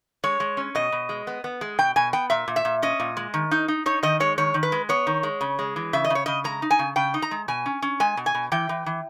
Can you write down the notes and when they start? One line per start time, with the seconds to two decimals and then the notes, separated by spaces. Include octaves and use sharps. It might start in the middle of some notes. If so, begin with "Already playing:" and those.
0.24 G#3 C#5
0.40 G#3
0.57 C#4
0.75 B2 D#5
0.92 B2
1.09 G#3
1.27 B3
1.44 B3
1.61 G#3
1.78 B2 G5
1.96 B2 G#5
2.13 B3 G5
2.30 A#2 E5
2.48 A#2
2.56 E5
2.65 A#2
2.82 C#4 D#5
3.00 A#2
3.17 G#3
3.34 D#3
3.51 D#4
3.68 D#4
3.86 D#4 C#5
4.03 D#3 D#5
4.20 G#3 C#5
4.38 D#3 C#5
4.54 D#3
4.63 B4
4.72 G#3
4.89 B3 C#5
5.07 D#3
5.23 G#3
5.41 C#3
5.59 G#3
5.76 E3
5.93 C#3 E5
6.04 D#5
6.10 C#3
6.15 C#5
6.26 C#3 D#5
6.44 G#3 A#5
6.62 D#4
6.71 G#5
6.79 C#3
6.96 C#3 G5
7.14 D#4
7.22 A#5
7.31 G#3
7.48 B2 G#5
7.66 C#4
7.82 C#4
8.00 G#3 G#5
8.17 B2
8.26 G#5
8.35 B2
8.52 E3 G5
8.69 E3
8.86 E3